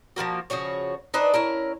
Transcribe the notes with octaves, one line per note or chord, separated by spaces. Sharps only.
F3 G#3 A#3 F#4
C#3 F3 F#4 C#5
D4 D#4 B4 C5
C#4 E4 A#4